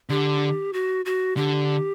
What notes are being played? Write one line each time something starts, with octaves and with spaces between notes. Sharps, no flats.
D3 G4
F#4
F#4
D3 G4